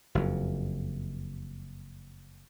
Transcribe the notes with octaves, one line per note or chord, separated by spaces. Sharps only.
F#1 F2